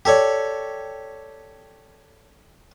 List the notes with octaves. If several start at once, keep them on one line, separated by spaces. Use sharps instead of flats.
G4 A4 C#5 D5